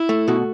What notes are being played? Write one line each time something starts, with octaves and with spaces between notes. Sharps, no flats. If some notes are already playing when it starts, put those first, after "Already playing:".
Already playing: E4
A3
B2 F#4